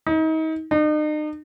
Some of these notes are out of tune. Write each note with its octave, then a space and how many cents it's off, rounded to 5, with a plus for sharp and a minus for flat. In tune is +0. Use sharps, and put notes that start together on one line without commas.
D#4 +35
D#4 -40